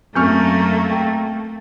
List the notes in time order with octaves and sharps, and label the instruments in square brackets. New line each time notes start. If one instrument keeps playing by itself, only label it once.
[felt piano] F#2 C#6 F6 [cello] A3 A#3 [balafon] C4
[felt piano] G5